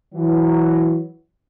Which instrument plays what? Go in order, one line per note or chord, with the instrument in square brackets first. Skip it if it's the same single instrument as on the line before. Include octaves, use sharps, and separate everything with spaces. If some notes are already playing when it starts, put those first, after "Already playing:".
[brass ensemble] E3 F#3